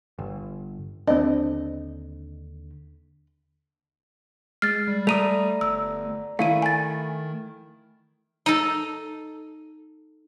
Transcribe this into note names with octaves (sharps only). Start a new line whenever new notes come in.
G1
D#2 D3 C4 D4 D#5
G#3 F6 A6 C7
G3
A3 D5 A#5 D#6 D#7 F7
G1 E6
D#3 A3 E4 F5 D#7
G#5 A6
D#4 A4